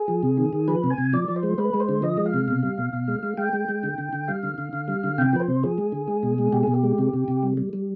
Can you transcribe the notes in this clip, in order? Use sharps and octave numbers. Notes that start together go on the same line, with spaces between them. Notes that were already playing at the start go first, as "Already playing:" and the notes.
Already playing: G#4
F3
C3
D#3
D#3
F3 B4
C3
G#5
C3
F3 D5
F3
C5
G#3
G#3 B4
G#3
C5
D3
F3 D#5
G#3
F5
C3
B2
G3
B2
B2
G#3
G#3
G#3 G5
G#3
G#3
D3
D3
D3
G3 F5
D3
D3
D3
G3
D3
C3 G5
F3 B4
C5
C3
F3 G#4
G#3
D3
G#3
B2
G#3
B2 G4
B2 G#4
G4
G#3
C3
C3
C3
G3
G3
G3